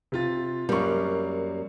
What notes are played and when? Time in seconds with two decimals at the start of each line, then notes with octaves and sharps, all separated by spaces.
0.12 C3 F4 A6
0.69 F#2 G3 A#3 F5 C#6